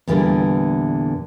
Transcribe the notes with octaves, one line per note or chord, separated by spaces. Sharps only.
E2 A#2 D3 E3 G3